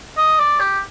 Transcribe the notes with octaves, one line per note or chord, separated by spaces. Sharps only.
D#5
D5
G4